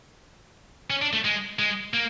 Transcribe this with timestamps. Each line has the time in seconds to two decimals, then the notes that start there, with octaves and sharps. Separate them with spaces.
0.90 C#4
1.02 D4
1.13 A3
1.25 G#3
1.59 G#3
1.94 A#3